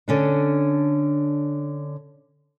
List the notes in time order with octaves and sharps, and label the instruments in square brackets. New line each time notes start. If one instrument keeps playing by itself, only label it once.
[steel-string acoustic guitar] D3 C#4 D4